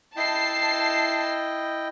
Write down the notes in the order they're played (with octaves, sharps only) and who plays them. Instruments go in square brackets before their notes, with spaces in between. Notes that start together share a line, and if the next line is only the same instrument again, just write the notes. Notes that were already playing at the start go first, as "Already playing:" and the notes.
[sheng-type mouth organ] E4 D#5 G5 [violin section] A5 C7